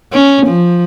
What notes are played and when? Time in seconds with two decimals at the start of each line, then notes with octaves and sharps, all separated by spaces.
0.13 C#4
0.47 F3